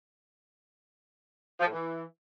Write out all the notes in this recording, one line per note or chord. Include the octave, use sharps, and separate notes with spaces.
F3
A2
E3